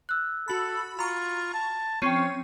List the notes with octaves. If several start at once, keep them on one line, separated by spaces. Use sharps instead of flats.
E6 F#6
F#4 A4 B5
F4 A#5 B5 C#6
A5
F3 C4 C#4 C#5 G5 C#6 D#7